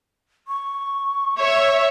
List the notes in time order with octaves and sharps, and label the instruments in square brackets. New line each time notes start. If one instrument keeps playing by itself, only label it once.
[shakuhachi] C#6
[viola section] C#5 E5